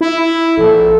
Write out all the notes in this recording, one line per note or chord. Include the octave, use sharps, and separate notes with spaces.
E4
A#1 A4